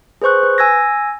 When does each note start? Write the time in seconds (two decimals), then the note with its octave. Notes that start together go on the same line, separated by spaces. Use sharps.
0.22 G#4 B4 C5 C#6 F#6
0.43 B4
0.58 G#5 E6 G#6 A#6